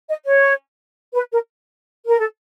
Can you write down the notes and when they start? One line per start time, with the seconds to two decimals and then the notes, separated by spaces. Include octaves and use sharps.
0.08 D#5
0.26 C#5
1.14 B4
1.32 A#4
2.08 A#4
2.19 A4